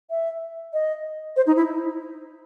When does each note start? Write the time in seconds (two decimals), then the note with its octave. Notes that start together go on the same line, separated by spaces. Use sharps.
0.10 E5
0.73 D#5
1.36 C5
1.47 D#4
1.56 E4